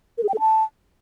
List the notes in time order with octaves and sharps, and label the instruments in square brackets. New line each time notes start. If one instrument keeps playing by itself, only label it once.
[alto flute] A#4
G#4
G5
A4
A5